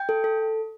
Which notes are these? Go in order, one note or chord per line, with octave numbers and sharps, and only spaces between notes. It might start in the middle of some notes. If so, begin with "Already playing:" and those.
Already playing: G5
A4
A4